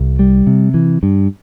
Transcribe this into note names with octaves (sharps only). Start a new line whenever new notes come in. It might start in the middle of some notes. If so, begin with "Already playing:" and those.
Already playing: C2
G3
C3
E3
G2